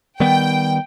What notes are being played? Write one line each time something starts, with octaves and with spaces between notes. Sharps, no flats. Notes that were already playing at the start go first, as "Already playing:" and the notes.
D#3 G3 B3 G5